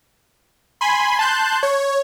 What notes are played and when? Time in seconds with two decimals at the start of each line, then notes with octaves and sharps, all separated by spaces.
0.81 G#5 B5 C6
1.19 A5 C6 F#6 G6
1.63 C#5